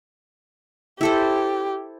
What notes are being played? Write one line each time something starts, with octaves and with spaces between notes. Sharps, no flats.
E4 G4 A4 C5